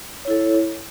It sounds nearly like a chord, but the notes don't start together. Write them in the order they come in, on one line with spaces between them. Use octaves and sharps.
C#5 E4 A4